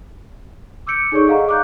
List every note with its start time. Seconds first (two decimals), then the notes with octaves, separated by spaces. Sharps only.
0.87 D6 E6 G6 C#7 D7
1.12 D#4 G#4 A4 C#5 D5 C#6
1.27 G#4 D#5 F5 F#5 A#5
1.49 D6 F#6 G6